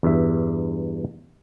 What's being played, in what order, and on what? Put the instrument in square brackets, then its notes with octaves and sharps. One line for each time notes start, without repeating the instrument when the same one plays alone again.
[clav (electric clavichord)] E2 G2 E5